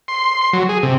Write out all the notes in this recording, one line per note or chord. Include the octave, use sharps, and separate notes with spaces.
C6
C6
F#3
G#4
C3